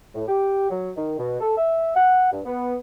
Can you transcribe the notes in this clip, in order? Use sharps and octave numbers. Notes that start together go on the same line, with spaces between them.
A2
G4
F#3
D#3
B2
A4
E5
F#5
G2
B3